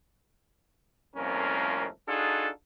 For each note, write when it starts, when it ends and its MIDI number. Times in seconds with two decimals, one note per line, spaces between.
1.16 1.86 36
1.16 1.86 41
1.16 1.86 46
1.16 1.86 57
1.16 1.86 61
1.16 1.86 70
2.08 2.49 62
2.08 2.49 63
2.08 2.49 65
2.08 2.49 66
2.08 2.49 68
2.08 2.49 69